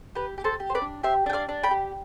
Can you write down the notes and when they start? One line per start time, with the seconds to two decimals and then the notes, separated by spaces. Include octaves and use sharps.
0.15 G4 B4
0.38 G4
0.44 A4 C5
0.60 G4
0.70 C5
0.75 B4 D5
0.81 D4
1.03 G4 C5 E5
1.26 D4 G5
1.33 D5 F5
1.49 D4
1.63 G5 B5
1.71 G4